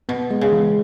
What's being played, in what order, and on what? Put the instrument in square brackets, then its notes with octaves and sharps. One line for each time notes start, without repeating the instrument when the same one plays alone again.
[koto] B2 [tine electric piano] B3
[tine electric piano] G#3
[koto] C#3
[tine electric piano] E3